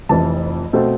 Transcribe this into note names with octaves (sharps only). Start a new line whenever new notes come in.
F1 F2 E3 A5
B2 A3 C4